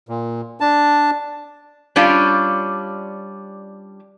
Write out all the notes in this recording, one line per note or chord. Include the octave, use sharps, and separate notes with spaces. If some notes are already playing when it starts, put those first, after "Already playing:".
A#2
D4 A5
G3 C#4 D4 F4